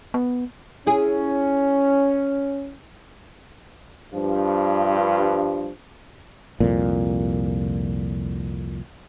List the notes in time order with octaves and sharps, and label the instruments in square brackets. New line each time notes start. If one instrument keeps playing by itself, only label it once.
[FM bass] B3
[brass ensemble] C#4 [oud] E4 G#4
[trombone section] G2 F3
[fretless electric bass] C2 F2 A#2